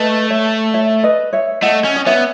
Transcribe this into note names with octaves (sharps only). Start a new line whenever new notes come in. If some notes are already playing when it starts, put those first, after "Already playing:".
Already playing: A3 B4 D#5
C#5 E5
C#5 E5
B4 D#5
C#5 E5
A3 D#5 F#5
C#4
D#5
B3 C#5 E5